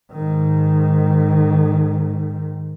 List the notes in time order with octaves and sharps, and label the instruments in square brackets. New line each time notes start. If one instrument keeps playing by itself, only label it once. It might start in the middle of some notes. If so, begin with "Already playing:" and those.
[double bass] G#2 D#3